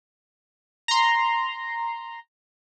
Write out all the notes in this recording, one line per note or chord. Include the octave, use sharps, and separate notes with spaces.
A#5 C6